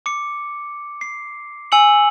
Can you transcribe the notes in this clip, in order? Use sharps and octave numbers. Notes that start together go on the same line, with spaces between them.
D6 C#7
C7
G#5 E6 C#7 F#7